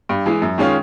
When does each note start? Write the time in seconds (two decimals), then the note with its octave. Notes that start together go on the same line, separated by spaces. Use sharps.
0.09 G2
0.26 E3 G#3
0.42 F#2
0.58 D#3 G#3 C#4 F4